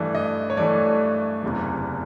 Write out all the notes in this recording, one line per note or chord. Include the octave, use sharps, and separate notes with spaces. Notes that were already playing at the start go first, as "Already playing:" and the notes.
Already playing: G2 E3 A3 D5
D#5
C#5
G2 E3 A3 D5
F#1 E2 C3 E3